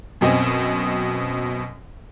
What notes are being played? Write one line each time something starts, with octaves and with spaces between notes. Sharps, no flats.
F#2 B2 C4 D#5 G#5